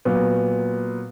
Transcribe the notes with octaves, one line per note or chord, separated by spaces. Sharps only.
A#2 F#3 B3